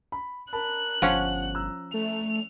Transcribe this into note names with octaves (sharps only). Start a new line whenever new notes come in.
B5
A#4 A5 B5 F#6
G1 F3 C#4 C#5 F#5
A#5 E6 F#6
A3 F7